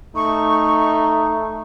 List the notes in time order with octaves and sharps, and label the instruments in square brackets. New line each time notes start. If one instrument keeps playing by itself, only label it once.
[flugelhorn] A3 [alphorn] D#4 [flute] C#6